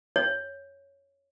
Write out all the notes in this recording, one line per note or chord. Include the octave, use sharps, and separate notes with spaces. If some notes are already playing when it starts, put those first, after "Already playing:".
C#5